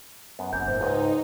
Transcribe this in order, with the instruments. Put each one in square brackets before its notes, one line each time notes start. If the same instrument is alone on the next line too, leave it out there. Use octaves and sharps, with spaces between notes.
[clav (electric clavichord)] F#2 B3
[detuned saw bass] F1 [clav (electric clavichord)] F#2 A#3 [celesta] G6
[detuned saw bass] G#2 [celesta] C5
[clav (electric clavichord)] C#2 G#2 [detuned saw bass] D#4